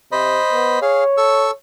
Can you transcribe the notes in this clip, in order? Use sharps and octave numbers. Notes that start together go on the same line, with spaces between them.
C3 C5 D#5 B5
B3
G#4 C#5 F5
A4 C#6 E6